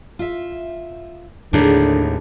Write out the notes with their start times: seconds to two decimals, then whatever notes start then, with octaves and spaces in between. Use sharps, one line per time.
0.19 F4 E5
1.53 D#2 A2 D3 D4 G#4 A#4